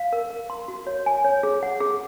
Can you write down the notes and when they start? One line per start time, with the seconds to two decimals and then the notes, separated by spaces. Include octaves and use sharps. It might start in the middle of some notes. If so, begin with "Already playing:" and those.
Already playing: F5
0.13 A#4
0.30 A#4
0.50 C6
0.68 F#4
0.87 C#5
1.06 G#5
1.24 C#5
1.43 G#4
1.63 F#5
1.80 G#4